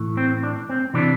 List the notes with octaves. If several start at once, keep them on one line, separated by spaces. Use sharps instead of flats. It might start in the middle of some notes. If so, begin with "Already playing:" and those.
Already playing: A2 E3 A3
C4
D4
C4
C3 E3 D4